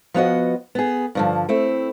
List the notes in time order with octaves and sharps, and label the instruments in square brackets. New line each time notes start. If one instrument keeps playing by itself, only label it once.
[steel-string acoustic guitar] F3 B3 F#4 D#5
B3 G#4
G2 D3 F3
A3 C4 E4